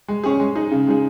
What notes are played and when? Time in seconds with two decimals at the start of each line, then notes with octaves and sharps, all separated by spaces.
0.08 G#3
0.24 C#4 G#4
0.40 G#3
0.55 D#4 G#4
0.71 C#3
0.87 G#3 D#4 G#4